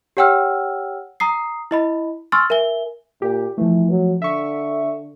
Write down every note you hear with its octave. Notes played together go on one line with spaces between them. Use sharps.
G4 C#5 F#5 G5 E6 F6
A#5 D#6 C7
E4 D#5 B5
G#5 C6 C#6 E6 F6 A6
A#4 E5 G#5 G7
A#2 G4
E3 F3 A3
F#3
D3 E5 C#6